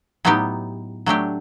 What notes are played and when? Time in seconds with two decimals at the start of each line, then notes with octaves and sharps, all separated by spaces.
0.25 A2 F#3 B3 D#4 G4
1.06 F#3 A3 D4 G4